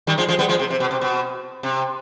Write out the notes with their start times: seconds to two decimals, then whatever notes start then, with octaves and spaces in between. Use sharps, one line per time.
0.07 D#3 G3
0.18 F3 G#3
0.28 F3 G#3
0.39 G3 B3
0.49 F3 G#3
0.59 C3
0.70 C3
0.80 B2
0.91 C3
1.01 B2
1.63 C3